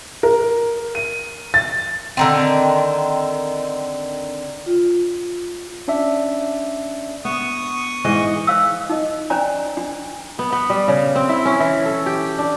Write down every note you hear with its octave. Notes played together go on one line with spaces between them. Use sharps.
A#4
D#7
A6
D3 D#3 C4
F4
C#4 D4 D5 E5
B3 C#6 D#6
G#2 E3 D#5
C5 F5 E6
D#4 D#5
C#4 C5 D5 G#5 A#5
D4
B3
B3
G3
C#3
C4
E4
C#4
E3
A4
G4
D4